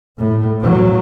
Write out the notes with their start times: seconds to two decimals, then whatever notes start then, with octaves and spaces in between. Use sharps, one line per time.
0.20 A2
0.62 F#3